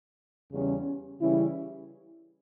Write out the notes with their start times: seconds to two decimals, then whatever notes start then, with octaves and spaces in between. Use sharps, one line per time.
0.51 E2 C#3 G3 C#4
1.21 C#3 E3 G3 C#4 E4